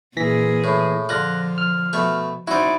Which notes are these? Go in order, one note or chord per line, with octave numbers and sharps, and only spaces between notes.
A#2 E3 A#3 G#4 A#6 B6
A2
D3 F3 F4 F#6 A#6
F6
B2 A3 C#6
D#4 E4 F#4 C5 D5